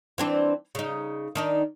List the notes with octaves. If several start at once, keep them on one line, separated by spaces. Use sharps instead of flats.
E3 C4 D4
C#3 D#4
D#3 D4 D#4